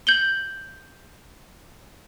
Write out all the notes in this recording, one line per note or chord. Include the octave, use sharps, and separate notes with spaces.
G6 F#7 G7